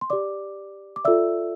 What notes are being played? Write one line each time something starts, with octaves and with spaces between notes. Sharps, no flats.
C6
G4 D5 D6
D6
F4 A4 D5 E5 E6